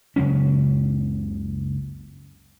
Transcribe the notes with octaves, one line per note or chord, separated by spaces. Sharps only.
F#1 C#2 F#3 C#4